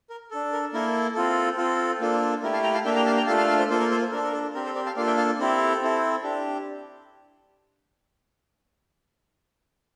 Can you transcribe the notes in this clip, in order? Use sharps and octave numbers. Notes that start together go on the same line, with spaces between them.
A#4
D4 A4
A#4
A#3 E4 A4 A#4
C4 F4 A4
C4 F4 A4
A#3 D4 F4 A4
A3 E4 G4 A#4
F5 A5
G5 A#5
F5 A5
A#3 D4 G4 E5 G5
G5 A#5
F5 A5
G5 A#5
A3 D4 F4 A4 F5 A5
F5 A5
F5 A5
A4 C5
A#3 F4 A4 C5
A#4
A4 C5
D4 A4 A#4
A#4
A4
C4 G4 A#4
A4 C5
A#4 D5
F5 A5
A#3 D4 F4 A4 D5 F5
E5 G5
F5 A5
C4 E4 G4 A4
C4 E4 A4
D4 G4